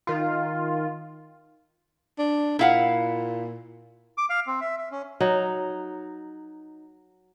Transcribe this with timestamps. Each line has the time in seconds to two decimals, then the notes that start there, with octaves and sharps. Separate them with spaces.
0.07 D#3 F4
2.19 D4
2.59 A#2 E4 F5 F#5
4.18 D6
4.30 F5
4.47 C4
4.61 E5
4.78 E5
4.92 C#4
5.20 F#3 D#4